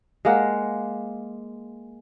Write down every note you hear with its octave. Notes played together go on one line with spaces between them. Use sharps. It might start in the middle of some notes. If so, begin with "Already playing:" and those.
G#3 A#3 F#5